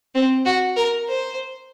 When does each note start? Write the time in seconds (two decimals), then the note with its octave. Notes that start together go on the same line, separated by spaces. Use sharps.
0.15 C4
0.45 F#4
0.76 A#4
1.08 C5